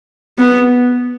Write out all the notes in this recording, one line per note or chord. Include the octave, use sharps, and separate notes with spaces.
B3